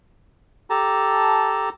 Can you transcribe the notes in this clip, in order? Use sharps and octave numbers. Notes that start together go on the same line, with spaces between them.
G4 A4 A5 A#5